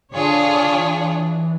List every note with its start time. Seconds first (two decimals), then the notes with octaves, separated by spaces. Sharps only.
0.12 D3 D4 F4 G#4 C#5
0.72 E3